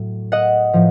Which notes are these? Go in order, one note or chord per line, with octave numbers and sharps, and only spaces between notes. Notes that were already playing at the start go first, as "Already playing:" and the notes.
Already playing: A2 F#3
D#5 F#5
A2 F3